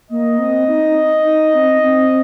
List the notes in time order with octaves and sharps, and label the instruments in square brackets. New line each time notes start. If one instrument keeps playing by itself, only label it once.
[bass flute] A#3 [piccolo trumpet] D#5
[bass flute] C4
D#4
D#4
C4
C4